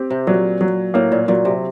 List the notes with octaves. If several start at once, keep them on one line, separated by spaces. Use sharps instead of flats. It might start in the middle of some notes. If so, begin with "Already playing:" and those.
Already playing: C4 G4
C3
A#2 F#3
F#3
A2 A#3
A#2
A#2 F#3
C3